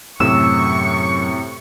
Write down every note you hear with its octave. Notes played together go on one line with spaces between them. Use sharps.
F#2 A2 C3 C#6 E6